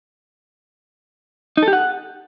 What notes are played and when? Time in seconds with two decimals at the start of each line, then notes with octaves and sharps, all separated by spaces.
1.57 D#4
1.63 A4
1.68 G4
1.73 F#5